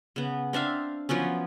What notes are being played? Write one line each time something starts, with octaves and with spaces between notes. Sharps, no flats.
C#3 B3
C4 D4 E5 F5
F3 F#3 B3 C#4